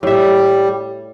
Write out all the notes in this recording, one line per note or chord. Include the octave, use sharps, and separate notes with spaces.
A2 G3 E5